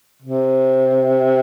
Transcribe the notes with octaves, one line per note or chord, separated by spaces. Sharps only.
C3